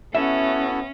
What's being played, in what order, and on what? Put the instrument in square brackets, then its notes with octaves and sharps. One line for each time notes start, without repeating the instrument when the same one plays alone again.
[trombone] B3 [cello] C#4 [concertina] E4 F#4 A4 [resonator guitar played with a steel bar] E5